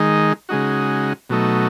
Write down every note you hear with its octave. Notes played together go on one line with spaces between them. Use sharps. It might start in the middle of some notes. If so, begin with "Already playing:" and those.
Already playing: D#3 G#3 D#4
C#3 G#3 D#4 F#4
B2 F#3 A3 D#4